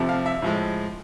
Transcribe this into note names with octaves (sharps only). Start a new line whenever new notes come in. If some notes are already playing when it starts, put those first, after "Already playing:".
Already playing: F2 C3 F3 A3
F5
E5
A2 F3 G#3